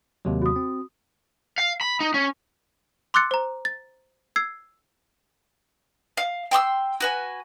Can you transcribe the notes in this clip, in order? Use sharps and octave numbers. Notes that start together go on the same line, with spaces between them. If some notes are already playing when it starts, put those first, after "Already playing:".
D#2 C3 F#3
F#4 D#6
C4
F5
B5
D#4
C#4
C6 D6 E6 F#6 A6 C#7
C5 A#5
A6
E6 G#6 C7
F5
G5 C6 D6 E6
F#4 B4 G#5